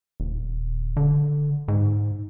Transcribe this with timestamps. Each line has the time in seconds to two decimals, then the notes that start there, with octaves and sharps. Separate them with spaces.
0.20 D#1
0.97 D3
1.68 G#2